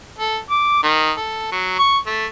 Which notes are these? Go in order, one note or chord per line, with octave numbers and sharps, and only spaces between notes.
A4
D6
D#3
A4
F#3
C#6
A3